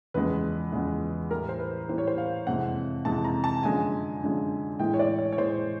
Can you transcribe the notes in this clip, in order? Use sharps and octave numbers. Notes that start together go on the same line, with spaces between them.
E2 C#3 F3 G#3 B4
E2 C#3 F3 G#3
A2 E3 G3 A#4
C5
B4
A2 E3 G3 C5
C#5
C5
F5
F2 C3 E3 G#3 F#5
F2 C3 E3 G#3 A5
A#5
A5
F#2 D3 F3 G#3 G#5
F#2 D3 F3 G#3
A2 E3 G#3 G5
C#5
D5
C#5
C#5
A2 E3 G#3 C5